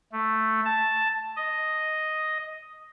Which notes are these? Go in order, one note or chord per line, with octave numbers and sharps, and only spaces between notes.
A3
A5
D#5